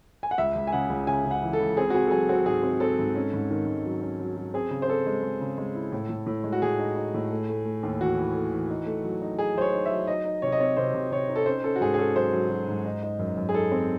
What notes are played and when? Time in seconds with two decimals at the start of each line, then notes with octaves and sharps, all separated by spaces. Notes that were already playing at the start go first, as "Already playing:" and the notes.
0.23 G#5
0.31 F#5
0.38 C#2 E5
0.55 C#2
0.67 G#5
0.72 C#3 F#5
0.90 C#2
1.07 C#3 G#5
1.25 C#3
1.31 F#5
1.43 E3
1.53 A4
1.60 C#2
1.77 C4 G#4
1.90 F#4
1.95 C4 G#4
2.07 A4
2.11 F#3 G#4
2.29 C4 F#4
2.46 G#2 G#4
2.63 C4
2.80 C4 A4
2.99 G#2
3.15 C#4
3.33 G#2
3.51 D#3
3.67 G#2
3.85 F#3
4.02 C#4
4.20 F#3
4.37 F#3
4.54 C4 G#4
4.71 C#3
4.82 C5
4.88 C4 A4
5.06 G#3
5.23 G#3
5.41 C#3
5.58 G#3
5.75 E4
5.92 A2
6.09 A2
6.27 A2
6.44 G#3
6.52 F#4
6.62 A2 G#4
6.79 D#4
6.96 D#4
7.14 A2
7.31 A3
7.49 A3
7.65 A3
7.83 D#2
8.01 E3 F#4
8.18 E3
8.34 A3
8.52 E3
8.70 D#4
8.86 A3
9.04 F#3
9.22 D#4
9.39 D#4 G#4
9.55 F#3 C5
9.61 C#5
9.73 D#4
9.86 E5
9.91 F#3
10.07 D#4 D#5
10.25 D#4
10.42 C3 C#5
10.52 D#5
10.60 C4 C#5
10.77 C3 C5
10.94 C3
11.11 C3 C#5
11.29 D#4
11.36 A4
11.46 C#4 C5
11.64 C#4 A4
11.76 F#4
11.81 G#2 G#4
11.94 G#4
11.98 C#4 A4
12.15 F#3 C5
12.33 F#3
12.50 F#3
12.68 G#2
12.85 D#4
13.03 D#4
13.19 F#2
13.37 F#2
13.49 G#4
13.54 D#4 A4
13.72 C4